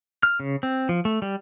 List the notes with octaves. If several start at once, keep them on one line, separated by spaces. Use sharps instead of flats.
F6
C#3
C4
F3
A3
G3